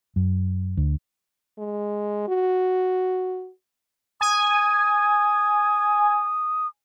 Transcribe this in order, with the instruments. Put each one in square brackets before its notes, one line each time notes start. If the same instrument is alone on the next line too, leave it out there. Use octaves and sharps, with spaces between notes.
[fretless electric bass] F#2
D2
[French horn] G#3
F#4
[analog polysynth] G#5 [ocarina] D#6